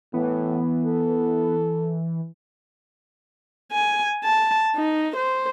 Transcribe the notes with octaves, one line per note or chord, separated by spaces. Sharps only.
A2 E3 B3
A4
G#5
A5
D#4
C5